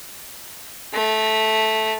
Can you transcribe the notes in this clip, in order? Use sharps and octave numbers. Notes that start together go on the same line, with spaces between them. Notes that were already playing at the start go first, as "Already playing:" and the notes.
A3